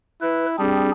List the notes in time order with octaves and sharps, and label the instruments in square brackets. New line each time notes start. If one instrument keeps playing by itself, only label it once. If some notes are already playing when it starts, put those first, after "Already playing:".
[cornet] E4 [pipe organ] B4
[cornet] G3 [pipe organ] C4 D4 G#4